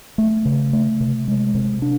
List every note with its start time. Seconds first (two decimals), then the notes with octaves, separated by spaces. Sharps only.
0.18 A3
0.45 C#3
0.73 A3
1.00 C3
1.28 G#3
1.55 C3
1.82 D4